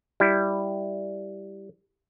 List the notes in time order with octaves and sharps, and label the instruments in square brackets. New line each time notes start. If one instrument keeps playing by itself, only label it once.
[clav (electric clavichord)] G3 E4